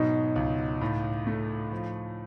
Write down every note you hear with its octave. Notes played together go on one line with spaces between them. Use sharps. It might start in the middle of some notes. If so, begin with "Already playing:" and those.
Already playing: G#2 B2 F#3 D#4
C#2
A2
A3
F3